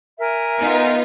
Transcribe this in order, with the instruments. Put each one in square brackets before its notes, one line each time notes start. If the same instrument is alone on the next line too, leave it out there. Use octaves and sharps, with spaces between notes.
[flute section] A#4 E5 G#5
[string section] B3 D#4 F4